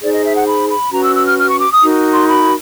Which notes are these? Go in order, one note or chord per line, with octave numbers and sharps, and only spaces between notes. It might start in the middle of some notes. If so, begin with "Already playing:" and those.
D#4 G#4 C5 D5
D#5
E5
F#5
B5
B5
C#4 F#4 B4 A#5
E6
E6
F6
F6
C#6
D6
D#6
D#4 F#4 A#4
C6
B5